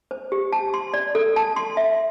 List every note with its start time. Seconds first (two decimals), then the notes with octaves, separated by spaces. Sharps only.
0.11 C5
0.32 G4
0.52 A5
0.74 C6
0.94 D5
1.15 A4
1.36 A5
1.56 C6
1.77 E5